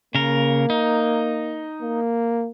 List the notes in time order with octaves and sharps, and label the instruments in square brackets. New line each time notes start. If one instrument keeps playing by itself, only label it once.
[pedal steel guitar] C#3 A#4 [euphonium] A#3
[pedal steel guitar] D#4
[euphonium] A#3